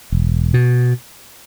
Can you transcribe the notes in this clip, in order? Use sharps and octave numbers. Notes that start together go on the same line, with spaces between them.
E1
B2